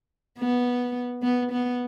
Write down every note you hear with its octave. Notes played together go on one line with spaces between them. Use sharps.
B3
B3
B3